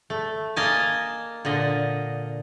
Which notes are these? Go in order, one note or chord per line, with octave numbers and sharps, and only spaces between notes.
A3
A#3 A#4 D#5 G#5 A5
A#2 D3 D#5